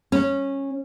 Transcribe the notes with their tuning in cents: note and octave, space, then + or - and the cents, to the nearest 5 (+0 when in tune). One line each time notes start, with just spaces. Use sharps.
C#4 -15